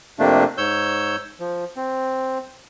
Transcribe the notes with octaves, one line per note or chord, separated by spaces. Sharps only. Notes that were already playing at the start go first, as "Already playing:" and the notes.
F2 C3 A3 A#3 D4
G#2 C#5 E6 G6
F3
C4